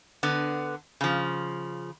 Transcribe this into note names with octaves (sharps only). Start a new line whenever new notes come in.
D3 B3
C#3 F3